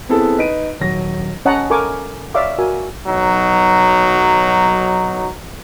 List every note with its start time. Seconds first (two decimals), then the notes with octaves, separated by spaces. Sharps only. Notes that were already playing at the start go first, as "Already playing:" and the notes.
0.09 B3 C4 E4 G#4 A4
0.38 D#4 B4 D#5 D7 D#7
0.80 D#1 F#3 A#6
1.45 C#4 C#5 D#5 F#5 A5 A#5
1.70 A4 A#4 G#5 C#6 D6
2.35 C#5 D5 E5 F5 D6
2.58 F#4 A#4 G#5 E6
3.07 B1 F#3 D#4